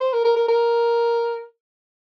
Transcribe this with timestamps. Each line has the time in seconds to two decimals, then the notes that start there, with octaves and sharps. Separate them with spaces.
0.01 C5
0.13 A#4
0.25 A#4
0.36 A#4
0.49 A#4